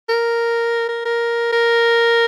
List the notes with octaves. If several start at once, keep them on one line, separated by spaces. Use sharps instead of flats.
A#4
A#4
A#4
A#4